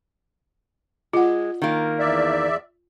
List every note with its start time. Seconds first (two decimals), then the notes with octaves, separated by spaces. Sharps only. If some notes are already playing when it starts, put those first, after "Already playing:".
1.13 G#3 F4 F#5
1.62 D#3 A#3
1.99 E2 D5 E5